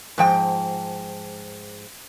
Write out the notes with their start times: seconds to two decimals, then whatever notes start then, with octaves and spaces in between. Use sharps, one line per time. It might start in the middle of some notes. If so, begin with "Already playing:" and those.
0.18 G#2 F3 G5